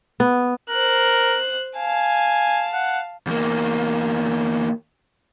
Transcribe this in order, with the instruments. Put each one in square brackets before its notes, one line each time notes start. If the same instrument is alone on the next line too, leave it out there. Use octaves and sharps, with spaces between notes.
[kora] B3
[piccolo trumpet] A#4 [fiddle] C5 F#6
[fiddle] F5 A5 [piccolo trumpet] G#5
[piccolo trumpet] F#5
[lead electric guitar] E2 A#3